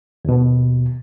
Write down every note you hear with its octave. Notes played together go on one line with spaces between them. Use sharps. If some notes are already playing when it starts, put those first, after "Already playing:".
D#2 B2